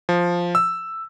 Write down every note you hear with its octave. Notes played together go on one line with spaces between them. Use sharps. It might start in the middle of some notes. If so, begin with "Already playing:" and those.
F3
E6